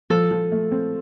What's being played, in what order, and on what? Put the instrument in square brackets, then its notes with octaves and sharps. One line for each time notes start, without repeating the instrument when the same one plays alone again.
[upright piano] F3 [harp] A4
[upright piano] F3
A3
C4